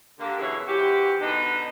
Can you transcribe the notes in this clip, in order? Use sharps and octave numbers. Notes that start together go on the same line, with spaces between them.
D3 A#3 G4
F#2 B2 E3 E4 G#4 C#5
G#2 E3 F#4 G4
B2 D3 D4 D#4